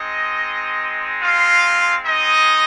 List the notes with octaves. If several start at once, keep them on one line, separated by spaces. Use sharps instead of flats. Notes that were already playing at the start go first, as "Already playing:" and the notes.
Already playing: G#3 C4 D#4 D#5
F4 F5
D#4 D#5